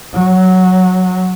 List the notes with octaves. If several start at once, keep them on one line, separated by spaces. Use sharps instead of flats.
F#3